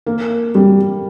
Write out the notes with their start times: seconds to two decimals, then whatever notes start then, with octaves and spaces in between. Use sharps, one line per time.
0.07 A#3
0.55 G3